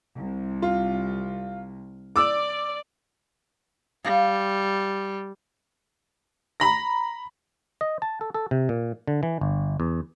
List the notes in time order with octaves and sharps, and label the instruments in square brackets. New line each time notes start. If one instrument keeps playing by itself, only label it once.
[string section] C2
[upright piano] F4
[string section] D5 [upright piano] D6 E6
[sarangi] G3 [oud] F5
[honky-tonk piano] A#5 B5 A#6
[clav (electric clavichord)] D#5
A5
A4
A4
C3
A#2
D3
E3
G1
E2